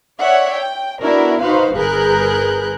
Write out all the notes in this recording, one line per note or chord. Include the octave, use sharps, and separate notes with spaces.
C#5 D5 E5 F#5
G5
B3 D4 E4 F#4 A#4
D#4 F#4 B4 C5 F5
G1 G#4 A#4 B4 F#6 G6